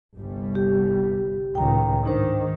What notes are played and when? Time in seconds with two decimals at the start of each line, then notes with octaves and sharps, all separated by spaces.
0.16 G1 C2 G3
0.55 G4
1.55 C#2 A2 D#3 G5 A#5
2.05 G#2 D#3 D4 C5